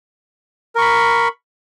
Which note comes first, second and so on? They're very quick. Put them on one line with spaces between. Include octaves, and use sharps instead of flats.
A#4 C#6 B5